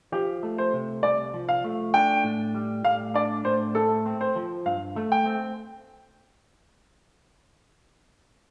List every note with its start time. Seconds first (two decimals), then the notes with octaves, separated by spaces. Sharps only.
0.12 F3 G4
0.43 A3
0.58 C5
0.73 C3
1.03 C2 D5
1.34 F3
1.49 F5
1.64 A3
1.94 D4 G5
2.24 A2
2.55 G3
2.84 A2 F5
3.14 D4 D5
3.45 A2 C5
3.75 A3 A4
4.06 C4
4.21 C5
4.36 F3
4.66 G2 F5
4.96 A3
5.12 G5
5.26 C4